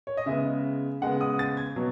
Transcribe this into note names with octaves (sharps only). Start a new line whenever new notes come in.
C#5
D#5
C#3 G#3 B3 E5
C#3 G#3 B3 F#5
D#6
A6
G#6
B2 F#3